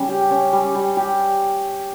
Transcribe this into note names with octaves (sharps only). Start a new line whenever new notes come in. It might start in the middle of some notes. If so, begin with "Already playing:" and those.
Already playing: C#3 G3 C#4
G4
C#4
G3
G3
G4